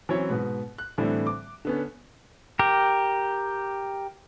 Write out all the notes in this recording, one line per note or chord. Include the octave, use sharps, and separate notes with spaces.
E3 F#3 C4 C#4 E4 C#5
G#2 B2 B4
F#6
A2 D3 E3 G3 C4
D6
D3 B3 C#4
G4 A#4